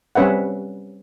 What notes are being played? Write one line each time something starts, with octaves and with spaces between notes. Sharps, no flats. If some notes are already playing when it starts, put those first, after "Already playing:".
G3 C4 C#4 B4 E5 F#5